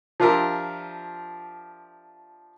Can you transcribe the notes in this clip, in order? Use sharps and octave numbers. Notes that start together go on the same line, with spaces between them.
F3 D4 F4 G4 A#4 E5